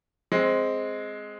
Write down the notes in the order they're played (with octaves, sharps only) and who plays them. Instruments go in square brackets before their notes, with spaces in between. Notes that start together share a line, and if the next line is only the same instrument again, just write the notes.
[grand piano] G#3 C4